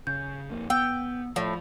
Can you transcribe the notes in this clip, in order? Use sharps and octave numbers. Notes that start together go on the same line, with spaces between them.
C#3 G6
F2 A#3
B3 G5 E6
A2 F3